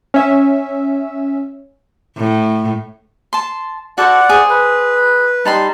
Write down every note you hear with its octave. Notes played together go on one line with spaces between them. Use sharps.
C#4 E5
A2
A5 C6
F#4 A4 C5 D5 F#5
G#4 C5
B4
G3 D#4 A5 B5 C6